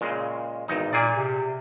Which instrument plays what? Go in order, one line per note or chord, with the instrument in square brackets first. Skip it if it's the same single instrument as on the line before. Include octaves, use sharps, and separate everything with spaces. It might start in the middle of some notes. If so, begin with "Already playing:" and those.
[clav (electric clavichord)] A#2 C#3 G#3
G#1 E2 D#4
[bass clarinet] A#2 [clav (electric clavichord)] G#4 D5
[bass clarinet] C3